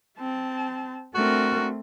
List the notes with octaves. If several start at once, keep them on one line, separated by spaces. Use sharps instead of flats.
C4 A5
A3 C4 D4 F#4 A#4